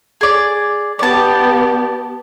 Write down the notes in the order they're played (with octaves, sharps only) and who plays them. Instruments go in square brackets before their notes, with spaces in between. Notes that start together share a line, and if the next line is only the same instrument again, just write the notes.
[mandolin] G#4 D5
[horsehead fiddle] B3 G4 [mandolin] D5 A5